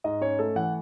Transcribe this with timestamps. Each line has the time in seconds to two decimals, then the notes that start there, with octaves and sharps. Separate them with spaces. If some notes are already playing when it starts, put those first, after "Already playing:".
0.04 G#2 D#5
0.21 C#4 C#5
0.39 A3 A4
0.56 E3 F#5